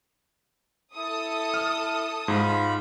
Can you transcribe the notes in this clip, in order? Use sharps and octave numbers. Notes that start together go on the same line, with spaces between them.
E4 A4 D#6
F6
G#2 F4 B5